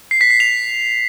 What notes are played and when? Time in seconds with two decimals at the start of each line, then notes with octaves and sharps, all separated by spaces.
0.11 C7
0.21 B6
0.30 C7
0.40 F7